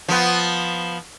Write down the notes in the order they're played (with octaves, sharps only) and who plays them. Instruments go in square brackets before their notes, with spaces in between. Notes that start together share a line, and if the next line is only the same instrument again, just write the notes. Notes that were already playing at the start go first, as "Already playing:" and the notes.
[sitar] F3 B3